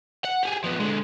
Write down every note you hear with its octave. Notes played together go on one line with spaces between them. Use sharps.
F#5
G4 G#4
F3 B3
D3 G#3